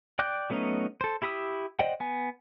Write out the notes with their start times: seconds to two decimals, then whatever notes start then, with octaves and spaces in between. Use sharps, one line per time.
0.19 D5 G5 D6 F#6 G6
0.50 F#3 A3 B3 C#4 D#4
1.01 A4 C5
1.22 E4 G4 B5 D#6 E6
1.79 C5 D5 D#5 F#5 G5
2.00 B3 G#5